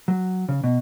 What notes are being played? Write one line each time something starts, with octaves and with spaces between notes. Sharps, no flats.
F#3
C#3
B2